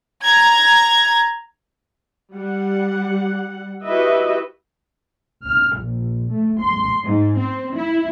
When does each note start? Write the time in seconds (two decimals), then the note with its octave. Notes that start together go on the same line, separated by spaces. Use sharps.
0.23 A#5 G#6
2.33 G3 F#5
3.84 E4 F#4 G4 B4 D#5 E5
5.45 F6
5.79 A#1
6.32 A3
6.61 C6
7.03 G#2
7.37 C4
7.75 E4